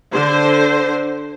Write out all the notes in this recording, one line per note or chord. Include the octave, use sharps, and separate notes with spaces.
D3 C5